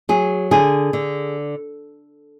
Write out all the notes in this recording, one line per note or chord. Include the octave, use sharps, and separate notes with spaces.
F#3 G#4
D3 G#4
D3